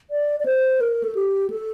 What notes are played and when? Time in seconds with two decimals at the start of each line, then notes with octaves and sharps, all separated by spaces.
0.11 D5
0.40 D5
0.46 C5
0.81 A#4
1.04 A4
1.15 G4
1.50 A4